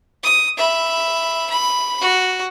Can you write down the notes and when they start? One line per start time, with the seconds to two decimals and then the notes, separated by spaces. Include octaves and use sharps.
0.24 D#6
0.57 E5 B5
1.50 B5
2.01 F#4